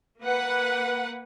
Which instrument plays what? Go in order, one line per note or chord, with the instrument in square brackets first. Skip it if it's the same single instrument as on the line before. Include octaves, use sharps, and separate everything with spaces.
[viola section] A#3 B4 F#5